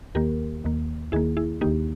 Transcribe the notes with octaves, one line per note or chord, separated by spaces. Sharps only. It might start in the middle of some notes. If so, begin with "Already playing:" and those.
D#2 D#3 A#3 G4 A#4
D#2 D#3 A#3
D#2 D#3 A#3 E4 G#4
E4 G#4
D#2 D#3 A#3 D#4 G4